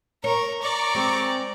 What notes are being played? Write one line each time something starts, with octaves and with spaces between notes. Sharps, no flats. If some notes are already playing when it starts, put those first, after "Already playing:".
A#4 C#5
D5 A#5 C#6 D6
G#3 C4